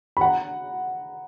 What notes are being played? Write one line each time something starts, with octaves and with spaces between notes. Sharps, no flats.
B5
F#5 A#5